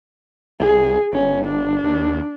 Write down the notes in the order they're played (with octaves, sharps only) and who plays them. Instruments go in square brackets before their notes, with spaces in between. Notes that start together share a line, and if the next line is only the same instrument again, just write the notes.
[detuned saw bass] C2 [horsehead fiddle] G#4
[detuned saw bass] G1 [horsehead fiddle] C#4
[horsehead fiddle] D4
[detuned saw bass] D#2